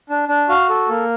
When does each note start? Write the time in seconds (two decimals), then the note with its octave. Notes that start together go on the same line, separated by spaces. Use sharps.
0.10 D4
0.29 D4
0.49 F#4 F5
0.69 A4
0.89 A#3